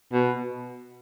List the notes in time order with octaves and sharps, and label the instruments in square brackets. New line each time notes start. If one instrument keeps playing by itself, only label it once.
[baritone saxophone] B2